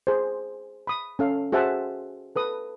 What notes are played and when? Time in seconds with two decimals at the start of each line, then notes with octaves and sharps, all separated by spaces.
0.07 G#4 C5
0.87 B5 D#6
1.19 C#4 A4 F5
1.52 F#4 G#4 C5 E5 F#5 A5
2.36 A4 B4 D#6